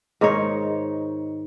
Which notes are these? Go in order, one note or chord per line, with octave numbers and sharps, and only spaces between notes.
G#2 D#3 D#4 C#5